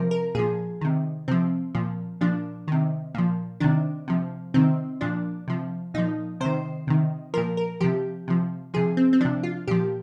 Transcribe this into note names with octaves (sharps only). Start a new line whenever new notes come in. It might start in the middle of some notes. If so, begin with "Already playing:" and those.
Already playing: C3 F3 A#4
A#4
A#2 F3 G#4
C3 D#3
C3 F3 C4
A#2 F3
A#2 F3 D4
C3 D#3
A#2 F3
C3 D#3 D4
C3 F3
C3 D#3 C4
A#2 F3 D4
C3 F3
A#2 F3 D#4
C3 D#3 C5
C3 D#3
A#2 F3 A#4
A#4
C3 F3 G4
C3 F3
C3 F3 G#4
C4
C4
C3 F3 D4
F4
A#2 F3 G4